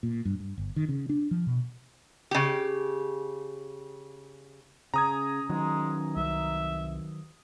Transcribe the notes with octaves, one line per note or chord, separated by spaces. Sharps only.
A#2
G2
G2
G1
D#3
C#3
D4
F3
B2
C#3 G4
C#3 C#4 A#5 D#6 G#6
D#3 F#3 G#3
C2 E5